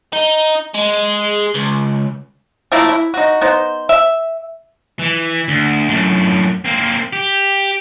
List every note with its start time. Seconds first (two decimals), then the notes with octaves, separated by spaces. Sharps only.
0.13 D#4
0.74 G#3
1.54 C#2
2.72 F3 A3 A#3 E4
2.89 E4
3.14 D#4 F#4
3.41 B3 D#4 C5
3.89 E5
4.99 E3
5.48 D2
5.88 F#2 A2
6.65 A#3 C4
7.13 G4